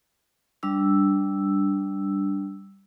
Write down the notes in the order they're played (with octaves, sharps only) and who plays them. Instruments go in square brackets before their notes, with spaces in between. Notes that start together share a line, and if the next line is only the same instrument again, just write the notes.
[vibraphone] G3 D4 E6